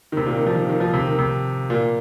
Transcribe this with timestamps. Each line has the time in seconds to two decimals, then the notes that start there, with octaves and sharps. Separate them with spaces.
0.12 D#3
0.17 C3
0.26 A#2
0.36 D#3
0.46 F3
0.55 D#3
0.69 D#3
0.80 F3
0.94 C3
1.07 D#3
1.19 C3
1.70 A#2